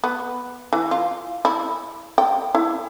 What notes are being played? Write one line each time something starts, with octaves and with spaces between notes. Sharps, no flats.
B3
E3
F4
E4
G5
E4